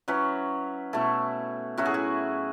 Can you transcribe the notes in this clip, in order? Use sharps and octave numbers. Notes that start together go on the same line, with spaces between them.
F#3 C#4 E4 B4
B2 A3 E4 A4
A2 F#3 C#4 E4 F#4
G#4
F#4